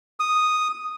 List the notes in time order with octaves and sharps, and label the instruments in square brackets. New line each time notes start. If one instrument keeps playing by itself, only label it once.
[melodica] D#6